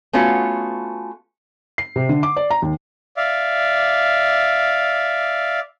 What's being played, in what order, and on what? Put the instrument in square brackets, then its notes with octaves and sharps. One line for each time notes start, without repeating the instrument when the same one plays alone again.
[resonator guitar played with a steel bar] A3 B3 C#4 F4 F#4
[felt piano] C7
C3
D3
D6
D5
A#5
D#2
[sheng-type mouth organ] D5 E5 F5